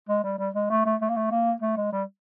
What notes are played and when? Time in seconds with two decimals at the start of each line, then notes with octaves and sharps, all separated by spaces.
0.09 G#3
0.23 G3
0.39 G3
0.55 G#3
0.70 A3
0.86 A3
1.01 A3
1.09 A#3
1.17 A3
1.31 A#3
1.62 A3
1.77 G#3
1.92 G3